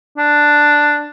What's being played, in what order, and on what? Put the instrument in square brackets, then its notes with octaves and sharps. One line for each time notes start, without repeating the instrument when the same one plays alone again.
[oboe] D4